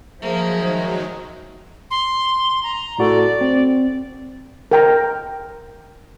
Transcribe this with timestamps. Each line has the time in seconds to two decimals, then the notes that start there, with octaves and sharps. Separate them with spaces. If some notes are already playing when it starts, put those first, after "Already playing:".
0.22 D#3 F3 F#3 G#3 A#3 G#4 C5 E5
1.91 C6
2.63 A#5
2.98 A2 F#4 A4 D5
3.41 C4
4.71 A#4 G5 A#5